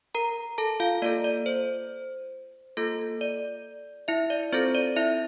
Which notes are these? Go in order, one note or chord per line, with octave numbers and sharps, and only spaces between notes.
A#4 A#5
A4 A5
F4 F5
A#3 F4 A4 D5
D5
C5
A#3 F4 A4
D5
E4 E5
D5
C4 F4 A4 C5
D5
E4 E5